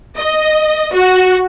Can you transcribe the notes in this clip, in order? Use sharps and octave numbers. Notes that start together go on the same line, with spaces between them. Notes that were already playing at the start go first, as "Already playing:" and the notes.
D#5
F#4